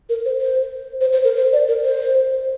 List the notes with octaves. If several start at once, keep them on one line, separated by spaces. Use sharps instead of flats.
A#4
C5
C5
C5
C5
A#4
C5
D5
A#4
C5